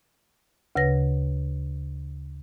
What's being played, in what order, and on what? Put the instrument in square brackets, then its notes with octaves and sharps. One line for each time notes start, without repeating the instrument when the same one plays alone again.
[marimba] D2 C#3 B4 A#6